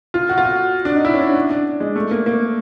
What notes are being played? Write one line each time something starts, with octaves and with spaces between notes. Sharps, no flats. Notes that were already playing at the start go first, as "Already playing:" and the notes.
F4
F#4
F4
F#4
D4
D#4
E4
C#4
D4
D4
D4
G#3
A3
A#3
A#3